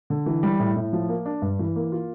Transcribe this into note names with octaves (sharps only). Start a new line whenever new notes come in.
D3
E3
G3
A2
A2
F3
A#3
D4
G2
E3
A#3
F4